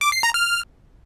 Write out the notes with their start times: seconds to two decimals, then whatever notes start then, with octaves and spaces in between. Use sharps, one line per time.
0.01 D6
0.12 C7
0.23 A#5
0.34 F6